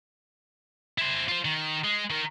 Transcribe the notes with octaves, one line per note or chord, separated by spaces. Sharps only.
E4 C5
F4 C5
D#3
G#3
D#3 A#4